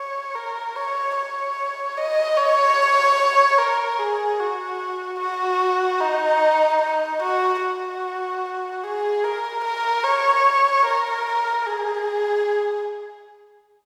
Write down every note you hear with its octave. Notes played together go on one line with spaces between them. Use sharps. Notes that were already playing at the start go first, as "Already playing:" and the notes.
Already playing: C#5
A#4
C#5
C#5
D#5
C#5
A#4
G#4
F#4
F#4
D#4
D#4
F#4
F#4
G#4
A#4
A#4
C#5
A#4
G#4